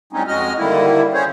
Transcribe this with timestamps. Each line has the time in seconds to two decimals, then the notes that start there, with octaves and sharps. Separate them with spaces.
0.13 A2 G3 G#3 C4 C#4 D#4
0.27 F2 G#3 F#4 D#5 F6
0.58 D3 D#3 G3 A#3 E4
1.13 C#4 G#4 C5 C#5